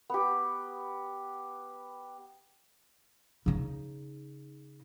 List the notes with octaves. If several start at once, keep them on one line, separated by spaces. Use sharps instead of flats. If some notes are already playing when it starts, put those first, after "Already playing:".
B3 G4
C#3 D#4